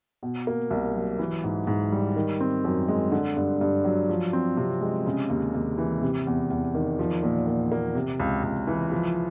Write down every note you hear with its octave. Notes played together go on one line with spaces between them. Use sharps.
B2
A#3
C2
F#3
E3
G#2
G#2
G3
D#3
C4
F#2
G#3
D3
G2
G2
F#3
F3
C4
C3
G#3
C#3
D#2
D#2
E3
C3
E2
E2
D#3
F3
A#2
A#2
A#3
C3
C#2
C#2
E3
F3